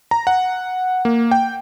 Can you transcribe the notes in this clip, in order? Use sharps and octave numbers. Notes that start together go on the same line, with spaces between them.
A#5
F#5
A#3
G5